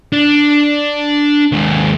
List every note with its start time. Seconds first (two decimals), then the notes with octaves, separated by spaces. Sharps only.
0.13 D4
1.52 D#2 G#3